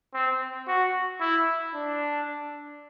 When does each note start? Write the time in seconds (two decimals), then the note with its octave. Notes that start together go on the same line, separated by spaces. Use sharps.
0.14 C4
0.68 F#4
1.21 E4
1.75 D4